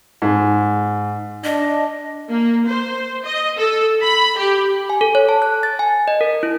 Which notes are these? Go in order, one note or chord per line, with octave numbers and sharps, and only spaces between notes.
G#2
D4 D#5
A#3
C5
D#5
A4
B5
G4
G#5
A4
C#5
A5
F#6
A6
G#5
D#5
A#4
E4